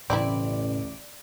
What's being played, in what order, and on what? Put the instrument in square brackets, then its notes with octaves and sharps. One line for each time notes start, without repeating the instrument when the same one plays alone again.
[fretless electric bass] E1 A2 C#3 [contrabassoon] A1 [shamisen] C4 D4 E4 [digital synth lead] D5